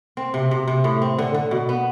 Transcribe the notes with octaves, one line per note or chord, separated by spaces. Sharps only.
C4
C3
C3
C3
A2
C4
D3
D3
B2
B3